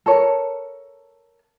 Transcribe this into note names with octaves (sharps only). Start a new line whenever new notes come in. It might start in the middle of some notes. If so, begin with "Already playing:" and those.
A4 A#4 C#5